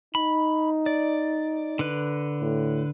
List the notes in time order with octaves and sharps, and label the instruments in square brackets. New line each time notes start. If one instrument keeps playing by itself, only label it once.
[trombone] D#4 [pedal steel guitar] B5
[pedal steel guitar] D5
D3 B4
[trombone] A2